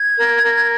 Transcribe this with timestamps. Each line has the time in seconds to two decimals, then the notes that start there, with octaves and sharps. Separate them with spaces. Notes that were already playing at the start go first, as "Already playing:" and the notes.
Already playing: G#6
0.17 A#4
0.44 A#4